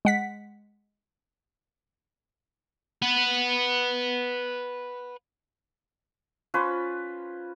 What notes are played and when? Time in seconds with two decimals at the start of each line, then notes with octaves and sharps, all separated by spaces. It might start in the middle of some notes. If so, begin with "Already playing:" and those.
0.05 G#3 F#5 B6
3.02 B4 F#5
6.54 C#4 F4 B4 C5